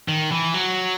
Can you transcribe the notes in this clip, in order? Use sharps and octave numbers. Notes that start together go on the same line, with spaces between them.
D#3
E3
F#3